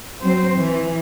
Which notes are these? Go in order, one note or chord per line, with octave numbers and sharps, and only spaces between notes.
F#3 C4 C5
E3